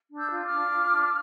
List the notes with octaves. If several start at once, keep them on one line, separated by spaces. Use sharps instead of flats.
D4
E6 G6
F4
D6 F6
D4
F4
D4